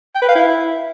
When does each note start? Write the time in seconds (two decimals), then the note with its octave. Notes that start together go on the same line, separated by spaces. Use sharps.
0.15 G5
0.22 B4
0.29 F5
0.36 E4